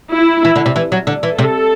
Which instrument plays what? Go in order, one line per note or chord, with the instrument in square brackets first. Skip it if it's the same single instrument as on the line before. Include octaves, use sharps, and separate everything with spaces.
[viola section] E4
[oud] E3
D3
C3
E3
F#3
D3
E3
[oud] C3 [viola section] A4